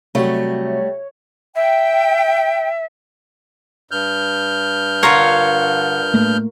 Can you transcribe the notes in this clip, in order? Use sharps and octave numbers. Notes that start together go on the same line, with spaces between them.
C3 F#3 G3 A3 F#4 C#5
E5 G5
G2 F6 G6
D3 F4 A#4 C#5 F5
A2 A3 A#3